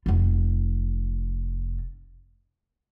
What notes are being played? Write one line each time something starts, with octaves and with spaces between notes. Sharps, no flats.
F1 F4